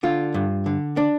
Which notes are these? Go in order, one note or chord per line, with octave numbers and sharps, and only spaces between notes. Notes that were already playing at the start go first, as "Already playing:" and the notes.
D3 F4
G2
D3
D4